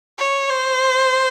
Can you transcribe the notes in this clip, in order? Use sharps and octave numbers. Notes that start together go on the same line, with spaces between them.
C#5
C5